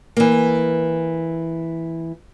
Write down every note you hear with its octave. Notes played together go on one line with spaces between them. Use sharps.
E3 A#3